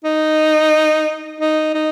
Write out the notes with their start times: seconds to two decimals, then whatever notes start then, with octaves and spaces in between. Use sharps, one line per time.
0.04 D#4
1.40 D#4
1.75 D#4